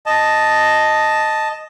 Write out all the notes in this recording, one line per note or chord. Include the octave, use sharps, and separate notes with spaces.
D#5 A5